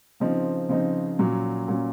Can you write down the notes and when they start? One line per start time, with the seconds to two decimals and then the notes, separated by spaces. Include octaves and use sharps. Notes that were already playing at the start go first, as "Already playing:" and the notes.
0.20 C#3 F3 C4 D#4
0.69 C#3 F3 C4 D#4
1.19 A#2 F#3 C#4
1.68 A#2 F#3 C#4